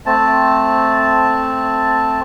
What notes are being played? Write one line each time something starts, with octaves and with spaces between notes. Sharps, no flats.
A3 C4 A5